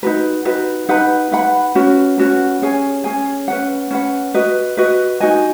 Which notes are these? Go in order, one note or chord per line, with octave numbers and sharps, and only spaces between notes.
D#4 F#4 B4
D#4 F#4 B4
D#4 B4 F#5 B5
D#4 B4 F#5 B5
C#4 F#4 B4
C#4 F#4 B4
C#4 G#4 C#5 G#5
C#4 G#4 C#5 G#5
C#4 B4 F#5
C#4 B4 F#5
F#4 B4 D#5
F#4 B4 D#5
D#4 F#4 D#5 G#5